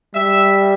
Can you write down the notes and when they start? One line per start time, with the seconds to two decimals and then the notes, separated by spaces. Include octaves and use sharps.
0.14 G3 E5